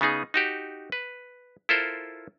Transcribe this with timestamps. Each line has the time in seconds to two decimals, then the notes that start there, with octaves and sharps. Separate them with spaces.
0.01 C#3 B3 D#4 G#4
0.34 D#4 F#4 G4
0.92 B4
1.69 E4 F4 A4 A#4 C5